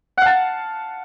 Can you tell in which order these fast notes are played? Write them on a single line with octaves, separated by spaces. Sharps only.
F#5 F5 A5